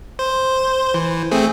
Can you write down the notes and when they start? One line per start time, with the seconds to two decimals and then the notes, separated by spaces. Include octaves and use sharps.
0.19 C5
0.94 E3
1.31 A3 C4 G#4